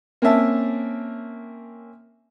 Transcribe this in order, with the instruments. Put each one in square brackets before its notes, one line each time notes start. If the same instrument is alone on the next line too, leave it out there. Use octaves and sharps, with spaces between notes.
[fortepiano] A#3 C4 C#4 E5 A5